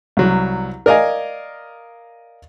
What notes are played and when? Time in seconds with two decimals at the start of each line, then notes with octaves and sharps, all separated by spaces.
0.17 C2 F#3
0.86 A#4 D5 D#5 F5 G#5